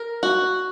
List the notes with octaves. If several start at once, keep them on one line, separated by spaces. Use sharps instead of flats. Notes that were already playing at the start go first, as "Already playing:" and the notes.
Already playing: A#4
F#4